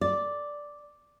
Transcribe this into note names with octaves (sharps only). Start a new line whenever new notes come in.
D5